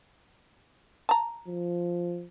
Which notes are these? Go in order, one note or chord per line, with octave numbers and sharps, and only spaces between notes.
A5 A#5
F3